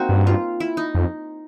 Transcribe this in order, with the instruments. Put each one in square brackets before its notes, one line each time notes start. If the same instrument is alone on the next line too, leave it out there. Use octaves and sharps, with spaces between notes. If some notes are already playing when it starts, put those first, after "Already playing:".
Already playing: [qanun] A#3 C4 D#4 F#4
[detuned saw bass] G2
[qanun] F4
E4
D#4
[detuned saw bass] F2